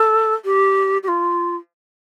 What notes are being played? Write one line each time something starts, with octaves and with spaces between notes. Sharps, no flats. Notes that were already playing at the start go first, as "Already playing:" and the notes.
Already playing: A4
G4
G4
F4